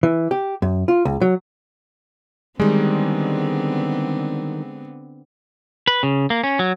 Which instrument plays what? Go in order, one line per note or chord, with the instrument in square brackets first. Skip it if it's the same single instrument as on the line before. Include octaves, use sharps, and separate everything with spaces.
[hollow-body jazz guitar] E3
G4
F#2
F4
C#2
F#3
[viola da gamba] D3 B3 C4 [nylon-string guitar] D#3 G3 [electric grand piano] G#3
[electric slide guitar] B4
C#3
A#3
C#4
F#3